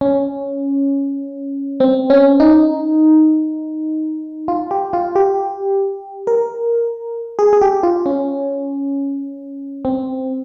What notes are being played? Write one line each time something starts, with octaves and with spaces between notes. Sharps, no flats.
C#4
C4
C#4
D#4
F4
G4
F4
G4
A#4
G#4
G#4
G4
F4
C#4
C4